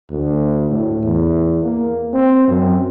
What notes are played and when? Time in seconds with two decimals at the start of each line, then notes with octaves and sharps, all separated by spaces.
0.11 D2
0.71 A2
1.04 E2
1.63 A#3
2.14 C4
2.48 F#2